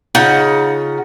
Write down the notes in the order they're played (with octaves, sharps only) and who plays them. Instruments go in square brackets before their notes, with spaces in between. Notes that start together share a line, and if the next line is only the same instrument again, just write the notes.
[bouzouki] C#3 D#4 F4 F#5